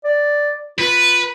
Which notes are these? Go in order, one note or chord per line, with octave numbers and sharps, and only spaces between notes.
D5
F4 B4